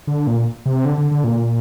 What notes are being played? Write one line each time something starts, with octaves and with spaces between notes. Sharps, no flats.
D3
A#2
C3
D3
D3
D3
A#2